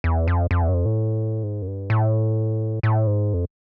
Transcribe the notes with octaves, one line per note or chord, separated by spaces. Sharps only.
E2
F2
F2
E2
F#2
F2
A2
G#2
F#2
G2
A2
A2
G#2
F2